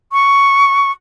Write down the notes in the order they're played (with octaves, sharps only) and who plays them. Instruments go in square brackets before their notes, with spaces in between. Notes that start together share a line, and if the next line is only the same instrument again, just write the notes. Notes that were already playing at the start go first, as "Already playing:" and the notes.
[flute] C#6